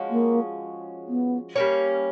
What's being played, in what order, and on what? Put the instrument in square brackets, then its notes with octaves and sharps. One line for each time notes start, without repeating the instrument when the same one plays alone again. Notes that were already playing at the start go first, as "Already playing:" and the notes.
Already playing: [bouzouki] F3 G#3 C#4 F#4
[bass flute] A#3
B3
[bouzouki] G3 A#3 C#4